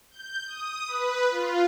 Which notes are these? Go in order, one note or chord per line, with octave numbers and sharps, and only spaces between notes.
G6
D#6
B4
F4